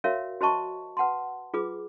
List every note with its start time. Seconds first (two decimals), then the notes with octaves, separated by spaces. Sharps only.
0.04 F#4 A#4 C#5 E5 F5
0.41 F#4 C5 D#5 A5 C#6
0.97 B4 F#5 A5 C6
1.54 F4 G#4 B4 D6